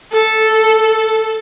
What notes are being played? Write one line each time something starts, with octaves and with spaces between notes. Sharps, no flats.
A4